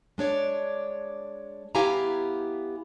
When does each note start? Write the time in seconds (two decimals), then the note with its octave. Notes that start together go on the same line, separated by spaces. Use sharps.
0.18 G#3 D4 C#5 D5
1.75 B3 E4 G4 F5 G#5 A#5